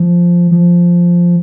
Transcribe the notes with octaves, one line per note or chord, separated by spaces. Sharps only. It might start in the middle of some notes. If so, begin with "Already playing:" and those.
Already playing: F3
F3